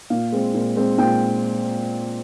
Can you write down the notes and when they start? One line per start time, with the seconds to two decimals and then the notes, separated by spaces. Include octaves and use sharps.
0.10 A#2 F5
0.32 G#3 C4
0.54 A#2
0.76 G#3 C4
0.98 A#2 G5